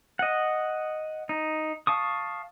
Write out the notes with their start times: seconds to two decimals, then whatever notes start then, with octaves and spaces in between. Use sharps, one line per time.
0.19 D#5 F#5
1.29 D#4
1.87 F5 A5 C#6 D#6